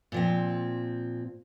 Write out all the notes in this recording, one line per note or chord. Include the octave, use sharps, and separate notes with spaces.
A#2 F3 C4